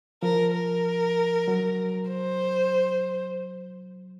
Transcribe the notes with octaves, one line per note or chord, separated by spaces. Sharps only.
F3 A#4
A#4
F#3
C5